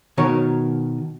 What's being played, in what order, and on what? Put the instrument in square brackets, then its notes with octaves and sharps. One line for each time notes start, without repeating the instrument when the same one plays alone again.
[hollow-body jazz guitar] B2 D#3 A#4 C#5